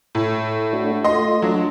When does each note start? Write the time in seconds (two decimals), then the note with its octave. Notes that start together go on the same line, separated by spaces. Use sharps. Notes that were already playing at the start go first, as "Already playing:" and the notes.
0.15 A2
0.73 A3 D4 F#4
1.04 A3 F4 D#5 C6
1.42 F#3 D4